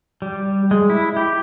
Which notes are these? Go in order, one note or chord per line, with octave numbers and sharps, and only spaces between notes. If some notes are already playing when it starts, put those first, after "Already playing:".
G3
G#3
E4
G4